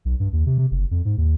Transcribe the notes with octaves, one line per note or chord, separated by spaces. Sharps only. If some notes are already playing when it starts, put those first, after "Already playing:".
B1
G2
D#2
C3
C3
F#1
F2
G#2
D#2